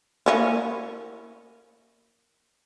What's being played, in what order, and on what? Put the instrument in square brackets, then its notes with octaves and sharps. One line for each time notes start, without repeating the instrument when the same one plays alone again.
[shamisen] A#3 C#4 E4